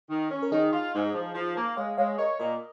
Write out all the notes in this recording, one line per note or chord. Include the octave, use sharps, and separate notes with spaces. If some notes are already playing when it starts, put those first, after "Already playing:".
D#3
C#4
A#4
D#3 D#4 G#4
F4
G#2
F3
F3
A#3
G#3 C#5 F5
G#3 C#5 F5
A#4 C#5 D#5
A#2 A#4 D#5